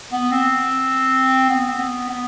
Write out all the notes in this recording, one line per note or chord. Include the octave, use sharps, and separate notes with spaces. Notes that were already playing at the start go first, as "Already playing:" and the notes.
B3
C4
B3
C4
B3
B3